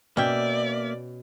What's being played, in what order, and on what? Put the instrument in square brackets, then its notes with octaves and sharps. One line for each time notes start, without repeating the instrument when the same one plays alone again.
[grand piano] B2 [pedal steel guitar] A#3 E5 [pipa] C#4 G5 [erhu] D5